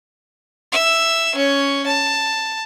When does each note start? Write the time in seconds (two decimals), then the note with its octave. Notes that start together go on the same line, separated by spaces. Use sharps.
0.72 E5 E6
1.35 C#4 C#5
1.86 A5